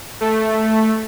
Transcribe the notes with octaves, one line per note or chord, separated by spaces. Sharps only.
A3